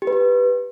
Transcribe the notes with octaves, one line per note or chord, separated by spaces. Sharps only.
G4
B4
G4